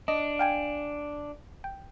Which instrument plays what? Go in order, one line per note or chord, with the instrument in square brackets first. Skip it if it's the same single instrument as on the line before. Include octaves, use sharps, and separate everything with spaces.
[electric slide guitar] D4 [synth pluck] D#5
[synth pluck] F5 G5 G#5
G5